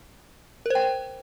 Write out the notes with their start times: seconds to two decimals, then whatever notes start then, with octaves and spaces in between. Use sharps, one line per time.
0.66 A#4
0.70 C5
0.75 G5